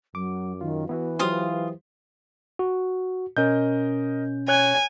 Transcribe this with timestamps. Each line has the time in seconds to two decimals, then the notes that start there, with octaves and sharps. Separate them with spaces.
0.15 F#2 F#3 D6
0.61 D#3 F4
0.89 E3 B3 E4 F#4 B4
1.19 F#3 F4 G4 C5 F5 D#6
2.59 F#4
3.37 B2 C#4 A#4 D#5 G6
4.48 C#5 G#5 F#6 G#6